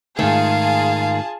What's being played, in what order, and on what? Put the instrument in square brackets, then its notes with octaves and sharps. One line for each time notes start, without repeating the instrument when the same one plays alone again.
[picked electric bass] G#2 A3 [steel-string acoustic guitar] D#3 [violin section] F4 G#4 A5 [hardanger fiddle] F5